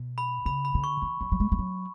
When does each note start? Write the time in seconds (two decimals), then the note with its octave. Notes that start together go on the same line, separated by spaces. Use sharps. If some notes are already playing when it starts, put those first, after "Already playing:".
Already playing: B2
0.18 B5
0.46 C#3 B5
0.65 B5
0.75 D3
0.84 C#6
1.02 E3
1.21 F#3
1.32 F#3
1.40 G#3
1.52 G#3
1.59 F#3